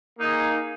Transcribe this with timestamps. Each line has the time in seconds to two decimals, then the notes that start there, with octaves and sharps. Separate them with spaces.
0.19 A#3 D#4 G#4